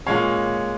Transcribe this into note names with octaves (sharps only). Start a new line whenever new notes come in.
A#2 G#3 C#4 C#5 F5